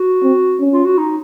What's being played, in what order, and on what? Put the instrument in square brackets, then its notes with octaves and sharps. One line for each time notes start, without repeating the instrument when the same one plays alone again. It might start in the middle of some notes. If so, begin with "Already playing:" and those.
Already playing: [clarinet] F#4
[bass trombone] C4
C#4
[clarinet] F4
F#4
D#4